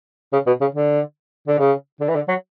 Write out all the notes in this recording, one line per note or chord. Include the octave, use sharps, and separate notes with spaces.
C#3
B2
C#3
D3
D3
C#3
D3
E3
D3
F#3